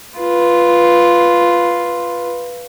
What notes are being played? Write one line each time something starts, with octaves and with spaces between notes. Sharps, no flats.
F4 B4